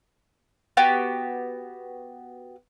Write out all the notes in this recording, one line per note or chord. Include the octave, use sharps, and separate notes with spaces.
B3 F#4 G4